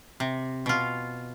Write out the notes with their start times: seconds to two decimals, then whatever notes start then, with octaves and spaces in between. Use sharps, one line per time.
0.20 C3
0.66 B2 F4